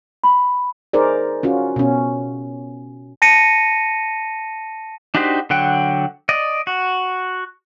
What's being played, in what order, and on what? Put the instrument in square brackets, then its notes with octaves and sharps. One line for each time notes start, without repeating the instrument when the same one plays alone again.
[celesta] B5
[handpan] D#4 G#4 A#4 C5 D5
C#4 F4 F#4
B2 C#4
[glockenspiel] A5 A#6 C#7 D#7
[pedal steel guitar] D4 D#4 F#4 G4 C5
D3 F#3 F#5 G5
D5 D#5
F#4